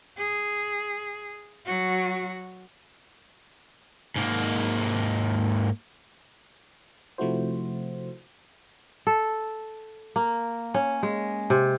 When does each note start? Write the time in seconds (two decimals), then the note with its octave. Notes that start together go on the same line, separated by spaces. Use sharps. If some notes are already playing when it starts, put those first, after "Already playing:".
0.18 G#4
1.66 F#3 F#4
4.16 G#2 A#3
7.18 C3 F3 A3 E4 F#4 C5
9.07 A4
10.16 A#3
10.74 C#4
11.03 G#3
11.50 C3